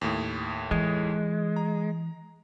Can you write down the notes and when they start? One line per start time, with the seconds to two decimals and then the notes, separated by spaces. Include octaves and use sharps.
0.01 D#2 A2
0.71 E3 G#3
1.56 A#5